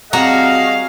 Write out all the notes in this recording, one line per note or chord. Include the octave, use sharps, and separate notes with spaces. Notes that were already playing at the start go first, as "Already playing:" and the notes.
G3 C4 F#4 G#4 D#5 F5 A5 A#5